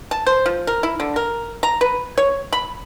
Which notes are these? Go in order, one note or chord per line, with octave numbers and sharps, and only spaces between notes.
A5
C5
F3
A#4
E4
D3
A#4
A#5
B4
C#5
B5